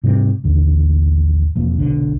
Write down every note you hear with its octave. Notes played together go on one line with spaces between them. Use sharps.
G#2 C3 G3
A1 D#2 D3
E1 F2 A#3
F1 B1 D3